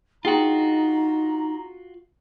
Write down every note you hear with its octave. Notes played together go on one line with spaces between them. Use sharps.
D4 D#4 F4 F#4 G#4 G5 A#5